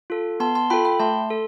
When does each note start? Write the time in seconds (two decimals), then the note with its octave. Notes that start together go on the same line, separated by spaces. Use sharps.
0.10 F4 A4
0.40 B3 A5 C6
0.55 A5 C6
0.70 F4 A4 G5 B5
0.85 G5 B5
1.00 A3 A5 C6
1.31 A4